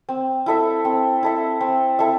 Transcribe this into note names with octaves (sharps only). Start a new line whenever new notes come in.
C4
E4 A4 E5
C4
E4 A4 E5
C4
E4 A4 E5